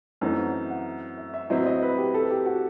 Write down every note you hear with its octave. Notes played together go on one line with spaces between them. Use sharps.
F#2 E3 A3 C4 D#4 E5
F#5
E5
F#5
E5
E5
A2 F#3 C4 E4 D#5
D#5
B4
G4
A4
G4
F#4